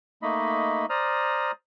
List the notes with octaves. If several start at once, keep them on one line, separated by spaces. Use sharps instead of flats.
A3 A#3 D#4 D#5 B5
C5 D5 A#5 D#6 F6